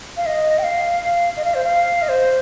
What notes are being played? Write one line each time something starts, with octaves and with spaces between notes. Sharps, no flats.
F5
D#5
G5
F5
D#5
F5
C5
F5
D#5
C5